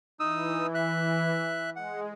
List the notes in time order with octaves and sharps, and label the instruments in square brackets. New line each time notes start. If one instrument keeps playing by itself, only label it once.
[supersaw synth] E3 [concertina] D#4 D#6 E6
[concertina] E5 F#6
[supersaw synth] G#3 [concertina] F#5